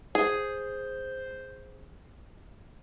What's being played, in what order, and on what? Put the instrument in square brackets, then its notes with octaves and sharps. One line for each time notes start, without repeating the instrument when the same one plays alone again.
[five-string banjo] G#4 [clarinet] C5